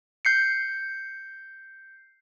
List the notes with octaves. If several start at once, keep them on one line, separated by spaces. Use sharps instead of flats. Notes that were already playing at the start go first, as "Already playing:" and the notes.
G6 C7 C#7